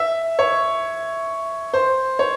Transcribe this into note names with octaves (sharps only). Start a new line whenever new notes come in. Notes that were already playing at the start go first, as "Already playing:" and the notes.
Already playing: E5
C#5
C5
C#5